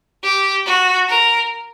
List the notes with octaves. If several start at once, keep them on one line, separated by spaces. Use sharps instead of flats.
G4
F#4
A#4